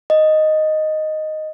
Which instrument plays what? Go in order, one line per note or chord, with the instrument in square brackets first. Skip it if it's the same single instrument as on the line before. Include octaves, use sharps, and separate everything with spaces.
[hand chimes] D#5